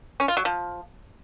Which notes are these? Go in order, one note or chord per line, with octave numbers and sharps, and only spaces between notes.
C#4
F4
F#3
F3